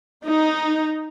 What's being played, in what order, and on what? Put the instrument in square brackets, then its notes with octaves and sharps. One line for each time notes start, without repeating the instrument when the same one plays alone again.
[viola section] D#4